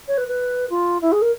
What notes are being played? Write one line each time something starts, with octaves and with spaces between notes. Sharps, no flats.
C#5
B4
B4
F4
E4
G#4
A#4